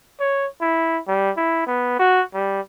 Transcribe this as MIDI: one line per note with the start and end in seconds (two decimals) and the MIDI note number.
0.20 0.47 73
0.61 0.99 64
1.08 1.31 55
1.37 1.64 64
1.66 1.98 59
1.99 2.22 66
2.34 2.60 55